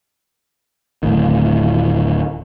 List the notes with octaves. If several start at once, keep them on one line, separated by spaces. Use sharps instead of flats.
D1 B1 A2 D#3